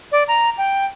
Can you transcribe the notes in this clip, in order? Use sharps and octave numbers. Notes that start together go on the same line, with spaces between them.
D5
A#5
G5